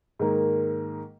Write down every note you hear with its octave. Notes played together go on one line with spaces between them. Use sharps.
G#2 D#3 A#3